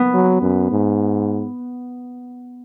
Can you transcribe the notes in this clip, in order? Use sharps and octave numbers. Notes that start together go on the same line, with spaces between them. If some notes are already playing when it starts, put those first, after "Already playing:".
Already playing: B3
F#3
F#2
G#2